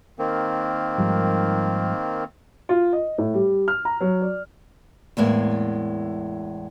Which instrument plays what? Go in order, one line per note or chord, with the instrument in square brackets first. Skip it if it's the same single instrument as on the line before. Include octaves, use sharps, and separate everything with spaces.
[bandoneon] D#3 A#3 C4
[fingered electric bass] G#2 F3 G3
[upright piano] F4
D#5
A2
G3
F6
A#5
F#3
D5
[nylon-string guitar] E2 A2 G#3 A#3